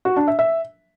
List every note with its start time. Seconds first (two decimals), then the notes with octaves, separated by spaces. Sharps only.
0.05 F#4
0.16 D4
0.28 E5
0.39 E5